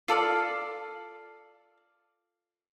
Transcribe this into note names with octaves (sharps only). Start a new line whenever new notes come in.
F4 A4 D5 F5